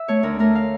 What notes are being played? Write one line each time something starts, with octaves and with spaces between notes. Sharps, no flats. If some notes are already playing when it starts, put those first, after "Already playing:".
Already playing: E5
A3 C#5
D2 A#4
A3 A#4
F5